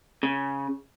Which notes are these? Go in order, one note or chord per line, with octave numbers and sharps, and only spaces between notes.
C#3